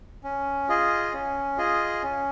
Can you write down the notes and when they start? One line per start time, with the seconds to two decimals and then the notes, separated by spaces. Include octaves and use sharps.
0.24 C#4
0.68 F4 G#4 D#5
1.13 C#4
1.58 F4 G#4 D#5
2.02 C#4